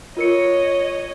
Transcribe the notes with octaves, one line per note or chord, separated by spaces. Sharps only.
F4 A#4 C#5 D#5 C#7